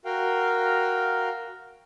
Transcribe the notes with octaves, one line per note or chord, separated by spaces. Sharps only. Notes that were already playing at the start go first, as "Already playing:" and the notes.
F#4 A#4 F5 G5